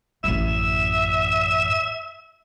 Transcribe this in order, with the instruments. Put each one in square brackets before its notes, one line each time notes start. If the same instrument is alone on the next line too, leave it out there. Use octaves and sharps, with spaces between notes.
[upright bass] A1 F#2 [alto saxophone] E5